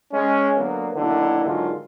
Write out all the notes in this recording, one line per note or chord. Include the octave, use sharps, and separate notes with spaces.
G#3 C#4
D3 F#3 A#3 B3
B1 D3 D#3 A#3 E4
G#2 D3 D#3 F#3 G#3 F4